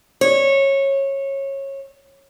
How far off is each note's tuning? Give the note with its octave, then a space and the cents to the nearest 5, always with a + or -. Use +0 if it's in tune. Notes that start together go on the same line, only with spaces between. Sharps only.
C#5 -20